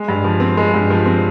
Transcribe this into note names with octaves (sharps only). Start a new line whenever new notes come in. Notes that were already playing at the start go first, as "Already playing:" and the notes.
Already playing: G#3
G2
F3
C4
G#3
G2
F3
C4